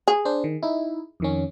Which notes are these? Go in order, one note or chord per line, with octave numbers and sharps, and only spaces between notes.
G#4
D4 C5
D#3
D#4 E4
F2 D#3 C#4